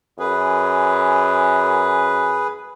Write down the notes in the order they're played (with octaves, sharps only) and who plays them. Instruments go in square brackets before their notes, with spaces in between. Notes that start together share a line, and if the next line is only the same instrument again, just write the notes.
[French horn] F#2 [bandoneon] G#4 B4